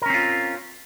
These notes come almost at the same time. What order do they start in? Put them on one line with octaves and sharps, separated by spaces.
A#4 C#4 C4 F4